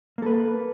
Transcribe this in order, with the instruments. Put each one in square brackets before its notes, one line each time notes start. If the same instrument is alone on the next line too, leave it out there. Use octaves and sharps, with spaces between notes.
[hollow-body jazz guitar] A#3
A4
B4